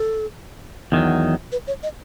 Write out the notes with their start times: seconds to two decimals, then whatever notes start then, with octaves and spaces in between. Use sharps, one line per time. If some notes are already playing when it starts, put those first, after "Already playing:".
Already playing: A4
0.92 E2 D#3 F#3
1.52 B4
1.67 C#5
1.83 D#5